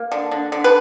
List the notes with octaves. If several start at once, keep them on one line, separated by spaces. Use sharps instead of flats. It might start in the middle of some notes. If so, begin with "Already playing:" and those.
Already playing: A#3
D3
D3
D3
B4